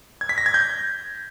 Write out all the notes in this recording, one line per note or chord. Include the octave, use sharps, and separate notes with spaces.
G#6
B6
A#6
G#6
G6